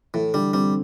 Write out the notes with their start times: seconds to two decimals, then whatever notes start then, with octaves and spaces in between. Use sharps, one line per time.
0.14 A2 E3
0.34 D3 G3
0.54 G3 C4